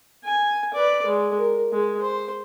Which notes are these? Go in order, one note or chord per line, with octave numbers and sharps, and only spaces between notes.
G#5
B4 D5
G#3
A#4
G#3 G#4
C5